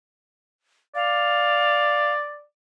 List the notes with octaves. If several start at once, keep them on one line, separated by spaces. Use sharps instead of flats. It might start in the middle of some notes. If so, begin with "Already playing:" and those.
D5 F5